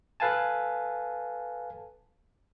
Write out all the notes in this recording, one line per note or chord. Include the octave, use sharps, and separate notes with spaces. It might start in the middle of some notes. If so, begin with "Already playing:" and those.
A4 B4 F5 G#5 A5